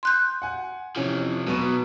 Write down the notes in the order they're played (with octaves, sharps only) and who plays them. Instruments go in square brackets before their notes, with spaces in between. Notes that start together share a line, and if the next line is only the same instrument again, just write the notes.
[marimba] C6 F#6 G6
[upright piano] F#5 G#5
[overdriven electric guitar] C3 F3 [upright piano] E3 C#4
[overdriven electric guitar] B1 B2 [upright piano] F#3 B4 C#6